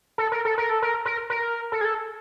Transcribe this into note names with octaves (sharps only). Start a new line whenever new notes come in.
A4
A#4
A4
A#4
A4
A#4
A#4
A#4
A4
G#4
A4